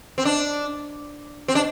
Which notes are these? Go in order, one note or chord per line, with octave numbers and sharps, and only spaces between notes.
C4
D4
C4
D4